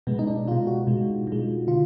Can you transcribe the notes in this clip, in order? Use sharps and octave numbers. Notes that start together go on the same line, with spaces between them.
B2 G#3 B3
D#4
D4
B2 G#3 F4
F#4
B2 G#3
B2 G#3
D3 F4